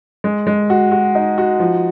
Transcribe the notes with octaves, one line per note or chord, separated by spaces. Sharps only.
G#3
G#3
F#4
F#4
D#4
F#4
F3